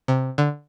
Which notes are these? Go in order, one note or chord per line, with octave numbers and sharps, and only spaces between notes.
C3
D3